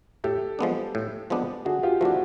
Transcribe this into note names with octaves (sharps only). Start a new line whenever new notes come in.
A2 G4 A4
F3 G#3 B3 D4
A2
F3 G#3 B3 D4
D3 F#4 G#4
F4 G4
F3 A3 D4 E4 F#4